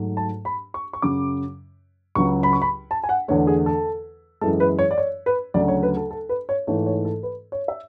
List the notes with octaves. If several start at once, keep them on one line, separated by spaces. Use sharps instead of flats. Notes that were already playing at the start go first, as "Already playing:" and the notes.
Already playing: G#2 F#3 A3
A5
B5
C#6
C#6
F#2 C#3 F#3 D6
C#2 C#3 F#3 C#6
B5
C#6
B5
A5
G#5
F#5
E2 D3 A3 C#5
G#4
A4
F#2 E3 G#3 A4
B4
C#5
D5
C#5
B4
D2 C#3 F#3 A3 D5
C#5
B4
A4
A4
B4
C#5
G#2 E3 A3 C#5
C#5
A4
B4
C#5
E5